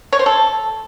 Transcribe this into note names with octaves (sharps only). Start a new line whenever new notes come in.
C#5
C5
A4